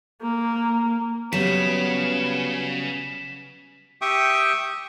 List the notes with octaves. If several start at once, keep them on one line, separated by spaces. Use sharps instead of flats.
A#3
C#3 F#3 G3 B3 B6 E7
G4 E5 G5 C#6 D#6